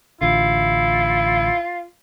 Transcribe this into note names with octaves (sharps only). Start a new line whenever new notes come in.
A1 D3 E4 F4